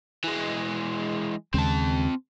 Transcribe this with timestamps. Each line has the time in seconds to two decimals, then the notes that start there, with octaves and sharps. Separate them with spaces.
0.24 E3 G#3
1.54 D#2 C#3 G#3 C4 A5